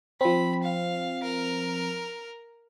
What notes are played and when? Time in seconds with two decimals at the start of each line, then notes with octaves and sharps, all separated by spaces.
0.21 F3 C4 B5
0.63 F5
1.23 A#4